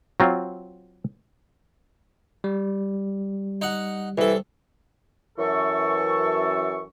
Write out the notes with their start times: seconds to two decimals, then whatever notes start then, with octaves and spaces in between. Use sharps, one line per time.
0.20 F#3 C4 F4
2.44 G3
3.62 D#4 F#5
4.18 C2 E3 A4
5.38 F#2 E3 A4 C#6